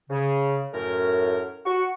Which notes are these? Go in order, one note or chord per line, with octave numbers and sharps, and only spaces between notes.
C#3
F#2 A2 A#4
F#4 C#6